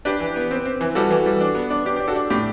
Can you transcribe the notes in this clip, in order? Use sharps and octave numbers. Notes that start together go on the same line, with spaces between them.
D4 G4 B4
E3
B3
C4
C4
E3
G3 F#4 A4
E3
G3
D4
B3
D4
D4 G4
G4
D4
F#4 A4
D4
A2 G4